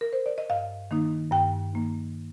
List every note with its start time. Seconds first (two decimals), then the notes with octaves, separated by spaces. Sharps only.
0.01 A#4
0.13 C5
0.26 D5
0.38 D#5
0.50 G2 F5
0.91 D#3 A#3 D#4
1.32 G2 G5
1.73 D#3 A#3 D#4